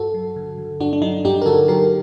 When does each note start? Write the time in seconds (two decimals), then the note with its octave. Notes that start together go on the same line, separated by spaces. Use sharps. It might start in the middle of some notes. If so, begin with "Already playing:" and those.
Already playing: G2 F#4 A4
0.14 F#3
0.36 D3
0.58 D3
0.80 G2 D4 F#4
0.93 D4
1.02 F#3 D#4
1.25 G2 D#4 G4
1.42 A#4
1.46 D3 F#4 A4
1.68 F#3 G4 A#4